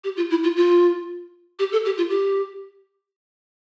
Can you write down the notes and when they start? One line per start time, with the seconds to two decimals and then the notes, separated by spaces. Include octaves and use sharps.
0.04 G4
0.17 F4
0.30 E4
0.44 F4
0.56 F4
1.59 G4
1.72 A4
1.85 G4
1.98 F4
2.10 G4